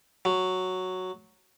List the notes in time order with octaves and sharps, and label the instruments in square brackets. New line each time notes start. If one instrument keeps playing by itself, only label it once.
[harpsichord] F#3